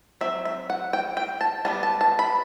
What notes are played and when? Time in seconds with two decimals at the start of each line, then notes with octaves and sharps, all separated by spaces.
0.21 F#3 C4 E5
0.45 E5
0.70 F#5
0.93 G5
1.17 G5
1.41 A5
1.65 G3 B3 D4 A5
1.83 A5
2.01 A5
2.19 B5